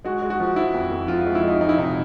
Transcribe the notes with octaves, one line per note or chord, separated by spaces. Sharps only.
G#3 F#4
G#3
F#4
F3
F3 E4
F2
F2
F3 F4
G#3 F4
E4
G#3 D#4
F3 D#4
E4
C3 D#4